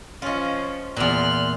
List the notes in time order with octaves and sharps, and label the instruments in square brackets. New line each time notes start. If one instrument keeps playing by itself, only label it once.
[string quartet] F3 C#4 [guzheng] F4 D#5
[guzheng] E2 A#2 [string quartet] C6 F6 F#6